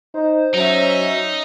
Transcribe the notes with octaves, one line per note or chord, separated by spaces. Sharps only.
D#4 C5
F#3 C#4 D#4 E5